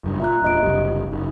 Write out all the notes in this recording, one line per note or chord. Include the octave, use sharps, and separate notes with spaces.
F#1 G2
A#2 E5 A#5 F#6
E1 A#2 D4 D#5 D7
F#1 C2 G4
F#1 D#4